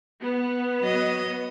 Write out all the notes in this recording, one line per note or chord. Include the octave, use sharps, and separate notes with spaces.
B3
F#3 D#5